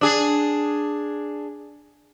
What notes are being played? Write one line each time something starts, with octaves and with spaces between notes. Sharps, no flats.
D4 G#4